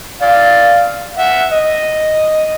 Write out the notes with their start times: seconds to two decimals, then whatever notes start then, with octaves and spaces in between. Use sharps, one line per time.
0.22 D5 F5
1.18 E5 F#5
1.52 D#5